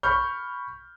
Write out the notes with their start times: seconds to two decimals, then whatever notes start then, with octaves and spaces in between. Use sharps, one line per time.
0.03 B5 C#6 F6 G6